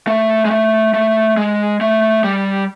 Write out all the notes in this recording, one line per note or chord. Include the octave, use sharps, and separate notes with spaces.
A3
G#3
A3
A3
G#3
A3
G3